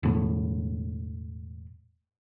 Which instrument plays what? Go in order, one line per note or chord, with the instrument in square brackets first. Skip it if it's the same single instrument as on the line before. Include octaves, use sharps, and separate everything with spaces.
[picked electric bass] E1 A2